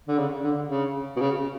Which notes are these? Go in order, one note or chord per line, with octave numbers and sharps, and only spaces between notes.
D3
C#3
D3
C#3
B2
C#3